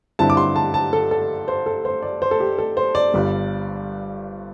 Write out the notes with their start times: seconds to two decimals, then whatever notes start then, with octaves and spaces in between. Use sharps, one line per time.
0.19 G2 D3 C4 E4 A5
0.30 D6
0.37 C6
0.56 A5
0.74 A5
0.93 A4
1.11 A4
1.48 C5
1.66 A4
1.85 C5
2.02 D5
2.22 C5
2.31 A4
2.40 G4
2.58 A4
2.77 C5
2.95 D5
3.14 G1 G2 G3